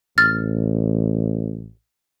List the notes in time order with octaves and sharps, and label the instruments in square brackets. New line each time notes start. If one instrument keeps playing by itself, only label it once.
[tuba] A1 [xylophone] F6 A6